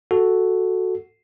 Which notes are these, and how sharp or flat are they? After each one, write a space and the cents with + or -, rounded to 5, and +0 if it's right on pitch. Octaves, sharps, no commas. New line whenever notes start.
F#4 +0 A4 +0